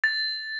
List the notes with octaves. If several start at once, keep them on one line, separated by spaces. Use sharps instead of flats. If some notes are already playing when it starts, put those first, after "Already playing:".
A6